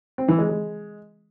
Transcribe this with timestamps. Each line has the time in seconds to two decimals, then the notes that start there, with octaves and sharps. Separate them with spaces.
0.18 C4
0.28 E3
0.39 G#3
0.49 G#3